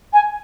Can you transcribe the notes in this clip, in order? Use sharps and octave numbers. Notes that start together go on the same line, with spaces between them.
G#5